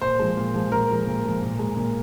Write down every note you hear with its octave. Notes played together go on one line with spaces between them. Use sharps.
A#2 C5
F3 G#3
A#2
F3 G#3
A#2 A#4
F3 G#3
A#2
F3 G#3
A#2
G#3
A#2